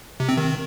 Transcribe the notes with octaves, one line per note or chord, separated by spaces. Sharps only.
C3
C4
D#3